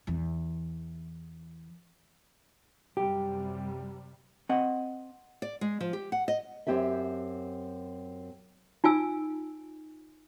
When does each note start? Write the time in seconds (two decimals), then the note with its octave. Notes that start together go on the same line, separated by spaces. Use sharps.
0.07 E2 E3
2.97 F#2 C3 G3 G4
4.49 C4 D#5 F#5
5.42 D5
5.61 G#3
5.80 F3
5.93 G4
6.12 F#5
6.28 D#5
6.67 F#2 C4 G4 C#5 E5
8.84 D#4 F4 G#5 E6